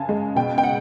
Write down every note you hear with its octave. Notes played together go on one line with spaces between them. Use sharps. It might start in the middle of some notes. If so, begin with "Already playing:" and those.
Already playing: F#2 C#3 G#5 A5
G#3
B2 G5
G5
F#5